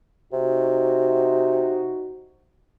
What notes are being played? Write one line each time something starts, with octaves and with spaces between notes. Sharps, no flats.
C3 D#4 F#4